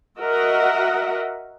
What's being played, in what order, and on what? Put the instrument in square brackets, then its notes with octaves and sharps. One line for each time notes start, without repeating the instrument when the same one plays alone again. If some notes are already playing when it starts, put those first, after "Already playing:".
[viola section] F#4 A#4 D#5 E5 F#5